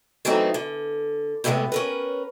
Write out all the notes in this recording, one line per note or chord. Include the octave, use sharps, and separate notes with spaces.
E3 F#3 A3 B3 C4 D#4
D3
A2 C3 F3 G3 G#3 B3
C#4 A#4 B4